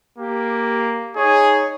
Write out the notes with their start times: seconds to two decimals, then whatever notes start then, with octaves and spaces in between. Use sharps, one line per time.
0.18 A#3 G4
1.16 D#4 G#4 C#5